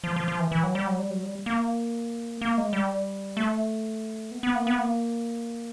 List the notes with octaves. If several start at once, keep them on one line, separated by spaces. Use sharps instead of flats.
F3
F3
F3
E3
E3
F#3
G3
F#3
G3
F#3
G3
A#3
A#3
G#3
G3
A3
B3
B3
A#3
B3
A#3